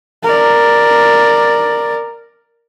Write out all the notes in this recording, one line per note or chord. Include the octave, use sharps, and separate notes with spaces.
A#4 D5